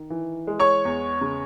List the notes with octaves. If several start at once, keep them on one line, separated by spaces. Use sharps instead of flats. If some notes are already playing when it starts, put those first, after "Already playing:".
Already playing: D#3
E3
G#3
C#5 C#6
E2
C#3